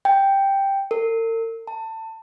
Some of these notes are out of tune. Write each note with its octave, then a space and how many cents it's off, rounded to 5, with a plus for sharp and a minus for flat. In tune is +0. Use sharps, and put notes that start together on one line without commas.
G5 +0
A#4 -45
A5 +25